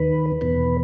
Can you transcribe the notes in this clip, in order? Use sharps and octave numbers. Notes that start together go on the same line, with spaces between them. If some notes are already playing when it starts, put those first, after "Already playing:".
Already playing: D#2 D#3 B4
E2 B2 B4